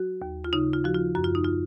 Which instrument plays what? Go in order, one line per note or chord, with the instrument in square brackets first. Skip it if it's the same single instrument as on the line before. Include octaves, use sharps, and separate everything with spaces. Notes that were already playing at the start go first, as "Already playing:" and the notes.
Already playing: [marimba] F#3 F#4
D#2
F4
C#3 D#4
F4
F3 F#4
F4
F#2 F#4
F4
D#4
F4